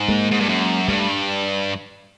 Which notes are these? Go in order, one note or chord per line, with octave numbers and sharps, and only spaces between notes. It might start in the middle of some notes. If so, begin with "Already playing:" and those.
Already playing: G#2
G#3 A#3
G#2
G2
F#2
G2 G3 A3